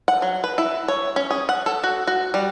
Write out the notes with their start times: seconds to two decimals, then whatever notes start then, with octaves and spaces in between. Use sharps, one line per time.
0.08 F#5
0.22 F#3
0.44 B4
0.58 E4
0.88 C#5
1.16 C#4
1.31 G#4
1.49 F#5
1.66 A4
1.83 F#4
2.07 F#4
2.34 G3